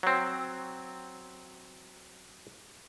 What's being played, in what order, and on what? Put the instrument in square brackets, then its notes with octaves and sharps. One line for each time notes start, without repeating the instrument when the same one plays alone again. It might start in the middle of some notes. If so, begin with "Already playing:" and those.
[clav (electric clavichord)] F#3 C4